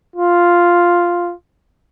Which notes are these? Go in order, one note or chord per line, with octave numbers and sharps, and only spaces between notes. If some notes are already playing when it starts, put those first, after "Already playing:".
F4